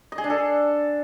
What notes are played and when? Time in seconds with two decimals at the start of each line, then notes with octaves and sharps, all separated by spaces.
0.12 D#5
0.18 G#4
0.24 D4
0.30 A4